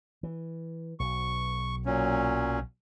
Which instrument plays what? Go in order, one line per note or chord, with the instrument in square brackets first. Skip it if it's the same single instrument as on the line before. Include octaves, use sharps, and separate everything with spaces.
[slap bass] E3
[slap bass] B1 [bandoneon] C#6
[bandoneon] A#2 F#3 C#4